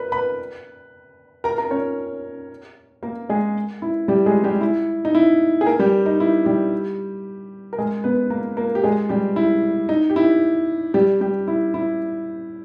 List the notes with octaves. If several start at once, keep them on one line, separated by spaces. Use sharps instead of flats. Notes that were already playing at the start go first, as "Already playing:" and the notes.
Already playing: A#4 B4 B5
B4 B5
A#4 A#5
A#4 A#5
C#4 C#5
A#3 A#4
G#3 G#4
E4
G3 G4
G#3 G#4
G3 G4
E4
D#4
E4
G#4
A#3 A#4
G3 G4
D#4
E4
G3 G4
A#4
G#3 G#4
B3 B4
A#3 A#4
A#3 A#4
G4
G#3 G#4
G3 G4
E4
D#4
G4
E4
G3 G4
G3 G4
E4
E4